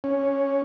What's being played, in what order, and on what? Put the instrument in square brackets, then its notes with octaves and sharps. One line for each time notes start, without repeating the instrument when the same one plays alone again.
[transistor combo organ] C#4